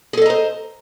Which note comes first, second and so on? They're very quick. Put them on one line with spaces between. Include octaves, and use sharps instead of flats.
G#4 A4 D#5 A#5 C5